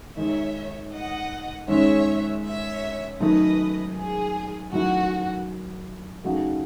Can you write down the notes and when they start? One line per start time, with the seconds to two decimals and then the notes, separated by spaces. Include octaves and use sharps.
0.16 D#3 G#3 D#4 C#5 E5
0.93 D#5 F#5
1.68 G#2 D#3 G#3 C#4 C#5 E5
2.44 C#5 E5
3.20 F#2 D#3 A3 D#4 B4 D#5
3.96 G#4
4.72 F#2 D#3 F#3 A3 E4 F#4
6.24 C#3 F#3 A3 D#4 F#4